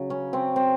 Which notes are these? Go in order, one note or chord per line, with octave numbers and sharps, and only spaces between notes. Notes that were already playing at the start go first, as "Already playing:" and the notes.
Already playing: C#3 F#3
C#4
C4
C4